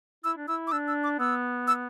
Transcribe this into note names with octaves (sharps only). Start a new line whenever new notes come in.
E4 E6
D4
E4 E6
D6
D4 E6
E6
D6
B3 E6
E6